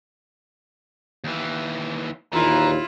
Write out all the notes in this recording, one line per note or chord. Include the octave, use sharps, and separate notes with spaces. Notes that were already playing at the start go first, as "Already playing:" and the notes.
D#2 E3
A#1 D#2 E3 E4 F4 A#5